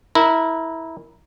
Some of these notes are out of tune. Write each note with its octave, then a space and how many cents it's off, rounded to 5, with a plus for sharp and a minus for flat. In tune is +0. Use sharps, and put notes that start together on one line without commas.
E4 -15 A#4 +0